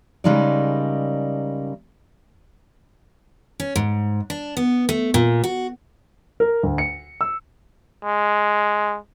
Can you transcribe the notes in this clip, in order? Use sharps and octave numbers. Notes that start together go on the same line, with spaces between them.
C#3 G3 G#3 D#4 A#4 D5
C#4
G#2
D4
B3
A3
A#2
F#4
A#4
D2
C#7
E6
G#3